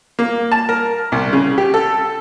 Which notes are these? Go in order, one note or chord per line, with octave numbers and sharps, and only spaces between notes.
A#3
A5
A#4
C2
C#3
G4
A4